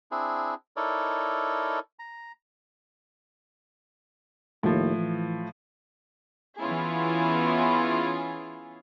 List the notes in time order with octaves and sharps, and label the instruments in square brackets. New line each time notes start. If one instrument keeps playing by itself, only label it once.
[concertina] C4 D4 E4 G#4
D#4 E4 A4 A#4 C#5 D5
A#5
[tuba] D#2 [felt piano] A2 F3
[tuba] E3
[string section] E3 B3 C#4 E4 F4 G#4